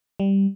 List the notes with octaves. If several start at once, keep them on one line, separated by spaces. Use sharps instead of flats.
G3